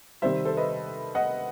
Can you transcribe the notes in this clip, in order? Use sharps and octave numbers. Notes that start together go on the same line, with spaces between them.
C3 D#3 G3 C5 E5
A4 C5
B4 D#5
D#5 F#5